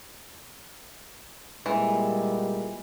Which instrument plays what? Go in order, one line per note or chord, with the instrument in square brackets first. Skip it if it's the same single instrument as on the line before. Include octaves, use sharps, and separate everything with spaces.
[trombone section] A#2 G3 G#3 [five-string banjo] E3